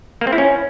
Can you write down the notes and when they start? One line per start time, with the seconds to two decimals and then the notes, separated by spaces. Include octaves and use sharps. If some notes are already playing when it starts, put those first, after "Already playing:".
0.21 A#3
0.27 C4
0.33 E4
0.38 C#4